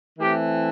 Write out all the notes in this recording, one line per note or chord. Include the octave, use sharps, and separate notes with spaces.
E3 A3 C4 G4